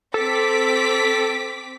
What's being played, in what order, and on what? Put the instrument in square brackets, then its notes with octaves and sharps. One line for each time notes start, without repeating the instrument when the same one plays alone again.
[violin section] C4 D6 B6 [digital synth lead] A4